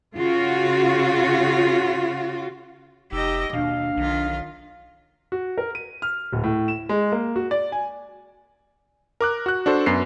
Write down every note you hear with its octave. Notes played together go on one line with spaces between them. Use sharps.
C#3 F4 F#4
F1 D#4 G4 D#5 E6
D#2 B2 D4 F5
B1 D#3 F4
F#4
A#4
D#7
F6
D1
A2
E7
G#3
A#3
F#4
D5
G#5
A#4 D6 F#6
F#4 F#6
D4 F#4 A4 C5
F#2 B3 C7